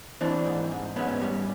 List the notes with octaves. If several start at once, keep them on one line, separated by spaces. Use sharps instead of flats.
E3 C4 D4
G#2
G#2
G#2 B3 C#4
G3